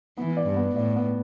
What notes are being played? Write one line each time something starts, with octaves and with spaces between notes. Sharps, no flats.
E3 B3
D5
G2
B3
A2 D5
B3